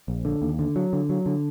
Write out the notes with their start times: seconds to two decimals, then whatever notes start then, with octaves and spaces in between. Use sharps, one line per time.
0.08 A#1
0.25 D3
0.42 D#2
0.59 D3
0.76 F#3
0.93 D3
1.09 F#3
1.26 D3